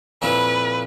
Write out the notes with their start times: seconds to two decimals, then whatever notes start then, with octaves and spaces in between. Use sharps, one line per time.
0.22 F2 A#2 E4 B4